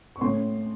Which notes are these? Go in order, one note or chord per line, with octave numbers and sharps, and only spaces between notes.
C#6
A2 C6